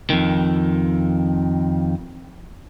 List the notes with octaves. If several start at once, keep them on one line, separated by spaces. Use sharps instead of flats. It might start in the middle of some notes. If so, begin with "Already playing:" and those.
F2 D#3